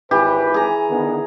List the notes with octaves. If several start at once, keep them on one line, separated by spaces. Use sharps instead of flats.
G#1 E3 G4 B4
G#4 A#5
D3 D#3 B3